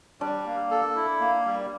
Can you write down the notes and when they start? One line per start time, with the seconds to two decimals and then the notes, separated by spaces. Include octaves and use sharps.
0.21 G3 D4 D5
0.46 A#3
0.71 A4
0.96 E4
1.20 A#3
1.45 G3